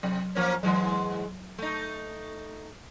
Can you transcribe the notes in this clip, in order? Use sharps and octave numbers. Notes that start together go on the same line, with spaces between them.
C3 F#3
F3 A#3 C#4
G#2 E3 F#3 G#3
A3 D#4